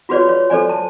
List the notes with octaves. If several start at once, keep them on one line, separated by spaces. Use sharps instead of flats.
F4 F#4 G#4 B4 C#5 D5
C#5
A4 C5 D5 G#5
A5